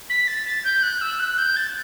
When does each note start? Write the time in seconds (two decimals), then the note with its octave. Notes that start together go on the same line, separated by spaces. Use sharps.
0.09 B6
0.27 A6
0.46 A6
0.64 G6
0.82 F#6
1.01 E6
1.19 F#6
1.37 G6
1.56 A6